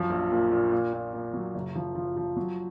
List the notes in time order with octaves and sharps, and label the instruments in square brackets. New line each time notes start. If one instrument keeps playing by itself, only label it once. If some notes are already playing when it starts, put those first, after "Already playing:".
Already playing: [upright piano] F#2 F3
A#1
A#2
A#2
A#2
A#2
A#2
F#3
F#1
F3
F3
F3
F#3